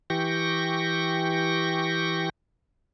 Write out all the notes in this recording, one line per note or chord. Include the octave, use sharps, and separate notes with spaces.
E3 G4 G5 C#6 A#6